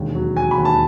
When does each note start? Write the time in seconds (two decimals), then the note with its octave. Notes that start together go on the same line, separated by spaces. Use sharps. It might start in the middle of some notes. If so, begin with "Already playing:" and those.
Already playing: E1 D#2
0.15 F#3
0.37 F#3 G#5
0.51 B5
0.58 D#2
0.65 A5